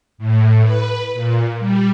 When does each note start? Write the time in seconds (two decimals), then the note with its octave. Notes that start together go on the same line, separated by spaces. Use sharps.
0.18 A2
0.62 B4
1.14 A#2
1.59 G3